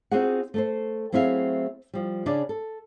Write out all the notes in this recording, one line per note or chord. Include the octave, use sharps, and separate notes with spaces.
C4 D#4 F4 F#4 G#4 F#5
A3 A4 C5
F#3 A3 C4 E4 G#4 F5
F3 G3
C#3 C#4 D4 D5
A4